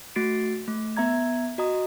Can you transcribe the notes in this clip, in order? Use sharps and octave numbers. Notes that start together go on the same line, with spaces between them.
A3 F#4 A6 C7 D7
A3
B3 E5 A#5 G#6
F#4 D#5 A#5 D#6